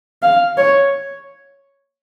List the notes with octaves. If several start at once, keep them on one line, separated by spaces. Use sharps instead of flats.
F5
C#5